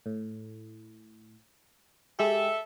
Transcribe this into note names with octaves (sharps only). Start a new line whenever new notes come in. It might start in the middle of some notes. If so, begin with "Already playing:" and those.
A2
G#3 G4 A4 E5